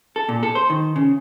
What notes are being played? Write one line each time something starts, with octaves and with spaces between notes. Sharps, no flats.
A4
A#2
A4
C5
D#3
C#3